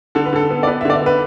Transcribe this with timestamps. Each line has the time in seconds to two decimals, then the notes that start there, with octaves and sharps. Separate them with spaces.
0.15 D3 A4
0.26 B4
0.33 D3 A4
0.50 B3
0.63 D5
0.67 B3 B4
0.81 E5
0.85 D3 D5
0.93 E5
1.01 B3
1.06 B4